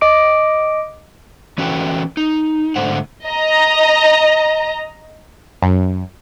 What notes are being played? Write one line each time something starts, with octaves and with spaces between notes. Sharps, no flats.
D#5 D6 D7
E3 C#4 F#4 A4 B4 G5
D#4
G#2 D3 A3 C5 F#5
D#5 A#5
F#2